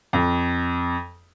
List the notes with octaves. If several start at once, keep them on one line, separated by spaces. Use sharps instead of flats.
F2